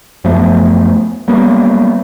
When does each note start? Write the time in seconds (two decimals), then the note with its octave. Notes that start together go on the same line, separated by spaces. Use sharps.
0.24 F#2 F3 A3 B3
1.28 F#3 G3 A#3 B3